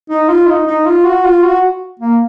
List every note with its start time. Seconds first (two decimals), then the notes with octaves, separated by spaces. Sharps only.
0.09 D#4
0.29 F4
0.47 D#4
0.67 D#4
0.86 F4
1.04 F#4
1.24 F4
1.43 F#4
1.99 A#3